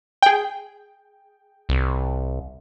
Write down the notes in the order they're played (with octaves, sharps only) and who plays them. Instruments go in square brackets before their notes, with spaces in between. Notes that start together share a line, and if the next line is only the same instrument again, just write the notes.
[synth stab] G#4 G5
[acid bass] C2